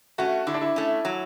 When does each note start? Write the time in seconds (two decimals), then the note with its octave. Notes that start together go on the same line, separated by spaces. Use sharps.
0.18 A3 C#4 F#4
0.47 D3 E4
0.54 D4
0.61 E4
0.76 A3 C#4
1.05 F#3